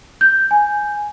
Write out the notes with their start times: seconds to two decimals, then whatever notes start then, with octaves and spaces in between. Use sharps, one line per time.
0.21 G6
0.51 G#5